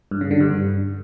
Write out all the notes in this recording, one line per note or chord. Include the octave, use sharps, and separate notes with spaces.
G2
C#3
D3
G2